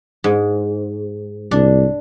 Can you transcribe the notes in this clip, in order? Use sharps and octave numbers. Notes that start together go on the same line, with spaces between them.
G#2
C2 D4